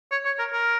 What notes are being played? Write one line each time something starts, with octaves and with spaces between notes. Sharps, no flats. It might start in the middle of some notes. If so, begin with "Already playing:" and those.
C#5
C#5
A#4
A#4